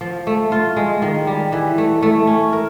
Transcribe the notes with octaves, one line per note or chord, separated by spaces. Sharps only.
F3
A3
F4
G#3
D#3
G3
E3
A3
A3
C#4
A#4